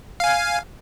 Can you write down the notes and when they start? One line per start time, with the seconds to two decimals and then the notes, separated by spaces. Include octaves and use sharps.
0.20 F5 G#5